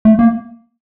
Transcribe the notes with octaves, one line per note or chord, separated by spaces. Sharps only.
A3
A#3